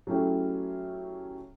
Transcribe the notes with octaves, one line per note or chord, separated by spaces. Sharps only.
F#3 A3 C#4 E4 G4